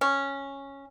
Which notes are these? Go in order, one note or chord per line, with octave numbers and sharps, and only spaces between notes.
C#4